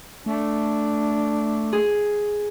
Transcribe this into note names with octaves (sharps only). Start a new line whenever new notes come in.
A3 D4
G#4